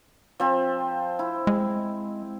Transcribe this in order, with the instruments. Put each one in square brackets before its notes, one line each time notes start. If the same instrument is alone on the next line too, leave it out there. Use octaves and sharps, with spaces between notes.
[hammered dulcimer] F3 C4
E4
[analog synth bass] G#3